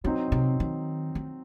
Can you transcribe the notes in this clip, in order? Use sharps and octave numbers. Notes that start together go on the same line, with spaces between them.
D3 F#3 C4 D#4
C3
D#3
D#3